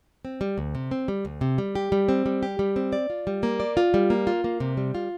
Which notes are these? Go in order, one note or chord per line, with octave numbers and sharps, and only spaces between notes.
C4
G3
D2
C3
C4
G3
D2
C3
G3
G4
G3
C4
G3
G4
G3
C4
D5
F4
G3
A#3
D5
F4
G3
A#3
F4
A#3
C3
G3
F4